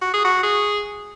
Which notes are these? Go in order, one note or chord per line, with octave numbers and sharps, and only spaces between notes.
F#4
G#4
F#4
G#4